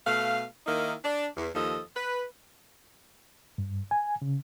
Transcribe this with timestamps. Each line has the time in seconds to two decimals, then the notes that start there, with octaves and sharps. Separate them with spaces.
0.06 B2 A3 F5
0.66 D#3 A#3 D#4 E4
1.04 D4
1.37 E2
1.54 D#2 F3 A4 D#5
1.95 B4
3.58 G2
3.91 G#5
4.22 C#3